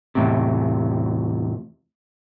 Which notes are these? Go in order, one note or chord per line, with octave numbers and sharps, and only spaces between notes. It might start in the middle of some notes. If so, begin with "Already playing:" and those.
E2 A2 C3